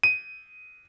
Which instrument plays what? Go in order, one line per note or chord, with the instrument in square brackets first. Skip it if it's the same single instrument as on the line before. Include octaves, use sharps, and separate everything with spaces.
[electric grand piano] D#7